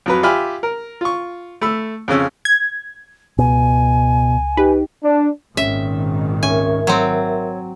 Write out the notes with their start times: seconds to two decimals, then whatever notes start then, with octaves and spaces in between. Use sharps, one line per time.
0.06 F2 F#3 B4
0.23 F4 G4 E5 G#5 B5 F6
0.63 A#4
1.01 F4 C#6
1.61 A3 B5 E6
2.08 F2 C#3 C#4 E6
2.45 G#6
3.38 C#2 B2 G#5
4.57 D#4 G4 B4
5.04 D4
5.57 G#1 A#2 D#3 C#4 E5
6.43 C#2 C#4 A#4 E5 G#5 C#6
6.87 F#3 C4 C#5 G#6